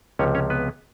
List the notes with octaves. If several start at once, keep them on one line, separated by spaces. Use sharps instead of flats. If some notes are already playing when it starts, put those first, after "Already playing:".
C#2 C3 F3 C#4 C#5
C#4 C#5
B3 B4